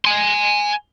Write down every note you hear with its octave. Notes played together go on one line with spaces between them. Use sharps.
G#5 C6